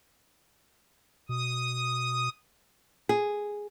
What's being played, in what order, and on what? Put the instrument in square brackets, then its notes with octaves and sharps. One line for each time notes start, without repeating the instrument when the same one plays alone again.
[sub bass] B2 [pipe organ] D#6
[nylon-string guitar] G#4